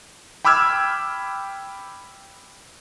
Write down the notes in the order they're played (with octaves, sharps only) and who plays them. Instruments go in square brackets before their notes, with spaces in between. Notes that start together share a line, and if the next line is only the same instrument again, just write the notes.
[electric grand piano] G5 B5 D6 E6 F6 G#6